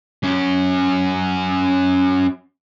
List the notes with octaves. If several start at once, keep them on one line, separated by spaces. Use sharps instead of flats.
F#2 C#4